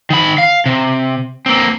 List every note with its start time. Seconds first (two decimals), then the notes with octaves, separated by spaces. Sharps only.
0.10 D#3 B5
0.38 F5
0.66 C3
1.46 A#3 C4